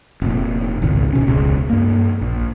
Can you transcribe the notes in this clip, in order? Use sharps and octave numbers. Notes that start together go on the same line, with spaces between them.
F1 A#2
G#1 C#2
E1 B2 C#4
E1 C#2
G2 A#3
A#1